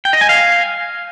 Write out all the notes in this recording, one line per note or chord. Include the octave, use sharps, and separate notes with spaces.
G5
D#5
G#5
F5